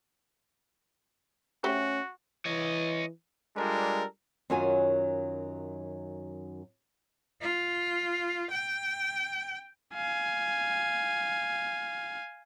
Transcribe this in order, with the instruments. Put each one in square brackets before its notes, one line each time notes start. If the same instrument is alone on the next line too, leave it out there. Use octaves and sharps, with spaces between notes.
[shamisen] A3 G4 C5 [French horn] C#4 [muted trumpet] F#4
[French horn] E3 [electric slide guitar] C#5 D#5
[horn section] G3 G#3 D4 F4 A4 A#4
[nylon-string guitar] F#2 D#3 F#3 F4 F#4 G#5
[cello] F4
G5
[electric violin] F5 G#5